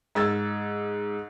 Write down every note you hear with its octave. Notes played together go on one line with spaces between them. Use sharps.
G#2 E6 G#6 A6